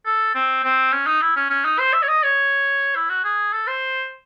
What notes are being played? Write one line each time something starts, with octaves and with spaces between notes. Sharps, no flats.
A4
C4
C4
C#4
D#4
E4
C#4
C#4
D#4
C5
E5
C#5
D#5
C#5
E4
F#4
G#4
A4
C5